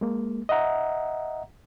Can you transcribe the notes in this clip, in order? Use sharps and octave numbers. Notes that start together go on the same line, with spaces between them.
G#3 A#3
D#5 E5 F#5 A#5